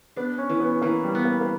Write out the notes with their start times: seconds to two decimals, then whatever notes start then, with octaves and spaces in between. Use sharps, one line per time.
0.16 B3 D4
0.38 C#4
0.49 E3
0.60 B3
0.82 E3 A#3
1.04 G3
1.15 B3
1.25 A#3
1.41 A#3